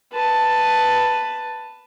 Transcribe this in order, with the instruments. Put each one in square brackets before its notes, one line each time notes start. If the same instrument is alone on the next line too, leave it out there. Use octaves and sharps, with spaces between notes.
[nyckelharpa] B4 A5